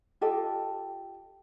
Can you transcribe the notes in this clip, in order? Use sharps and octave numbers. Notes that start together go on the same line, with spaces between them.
F4 G4 A4 D#5